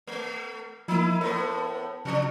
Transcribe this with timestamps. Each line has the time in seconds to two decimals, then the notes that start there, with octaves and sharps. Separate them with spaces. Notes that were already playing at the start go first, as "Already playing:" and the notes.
0.07 A3
0.88 F3 A#3 D#4 E4
1.21 A2 B3 A#4
2.05 C#3 F3 D4